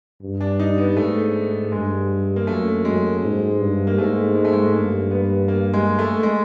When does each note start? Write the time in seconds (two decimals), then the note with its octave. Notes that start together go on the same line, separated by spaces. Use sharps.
0.22 G2
0.41 D4
0.60 D#4
0.78 B3
0.96 G#2 A3
1.72 G2 G#3
2.36 A#3
2.47 F#2 A3
2.85 F#2 G#3
3.23 G#2
3.60 G2
3.87 A#3
3.97 G#2 A3
4.35 G#3
4.45 A3
4.53 G#3
4.73 G2 A#3
5.11 B3
5.48 A#3
5.73 G#3
5.99 A3
6.23 G#3